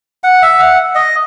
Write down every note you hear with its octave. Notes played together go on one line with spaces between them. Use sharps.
F#5
E5
F#5
D#5